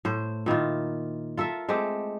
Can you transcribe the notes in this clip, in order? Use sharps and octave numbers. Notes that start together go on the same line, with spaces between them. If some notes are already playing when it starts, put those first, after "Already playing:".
A2 C5
A#2 D#3 E4 F4
F4 A4 A#4 E5
G#3 A3 C4 G4